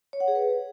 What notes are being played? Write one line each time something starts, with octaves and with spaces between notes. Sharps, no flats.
C#5
F#5
G#4
B4